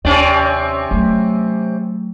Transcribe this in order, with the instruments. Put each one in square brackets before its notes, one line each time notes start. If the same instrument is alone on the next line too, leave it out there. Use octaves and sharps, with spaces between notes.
[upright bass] D#2 [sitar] C3 C#4 D5
[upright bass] F#3 A3